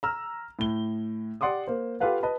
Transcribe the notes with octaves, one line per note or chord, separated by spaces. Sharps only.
A#5 E6 F6
A2 G7
G4 D5 F#5 C6 D6 D#6
A#3 C5
F4 G4 A4 B4 F5 F#5
B4 D#5 A5 B5